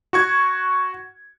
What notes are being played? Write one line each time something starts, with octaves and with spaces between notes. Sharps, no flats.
F#4 C#6 G#6